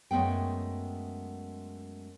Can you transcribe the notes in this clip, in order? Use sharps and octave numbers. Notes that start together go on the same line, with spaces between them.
F#2 G#3 A3 B3 G5